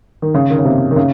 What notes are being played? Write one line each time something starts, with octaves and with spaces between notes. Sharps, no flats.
D#3
C#3
D#3
C#3
C3
D#3
C#3